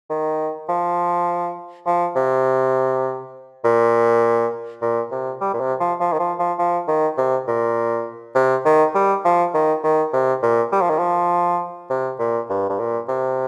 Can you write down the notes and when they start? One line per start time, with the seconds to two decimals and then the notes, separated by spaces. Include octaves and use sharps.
0.10 D#3
0.69 F3
1.86 F3
2.16 C3
3.64 A#2
4.82 A#2
5.11 C3
5.41 G3
5.54 A#2
5.60 C3
5.80 F3
6.00 F3
6.13 D#3
6.19 F3
6.39 F3
6.59 F3
6.88 D#3
7.17 C3
7.47 A#2
8.35 C3
8.65 D#3
8.95 G3
9.25 F3
9.54 D#3
9.84 D#3
10.13 C3
10.43 A#2
10.72 G3
10.81 F3
10.90 D#3
10.99 F3
11.90 C3
12.19 A#2
12.49 G2
12.70 G2
12.79 A#2
13.08 C3